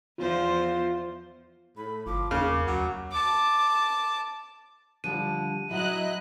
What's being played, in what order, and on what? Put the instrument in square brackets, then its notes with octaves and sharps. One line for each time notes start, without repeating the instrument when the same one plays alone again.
[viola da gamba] E2 F3 C5 [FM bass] F4
[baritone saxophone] A2 [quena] B5
[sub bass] G1 [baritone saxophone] F3 [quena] D6
[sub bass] E2 [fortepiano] C#3 [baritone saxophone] A#3 [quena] D6
[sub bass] D2 [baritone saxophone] F#3
[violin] A5 D6
[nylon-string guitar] D3 F3 G3 [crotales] D#7
[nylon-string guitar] F#3 [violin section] E4 D#5 F#6